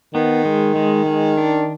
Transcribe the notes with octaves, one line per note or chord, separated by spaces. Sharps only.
D#3 B3
G#3
G#3
G#3
D4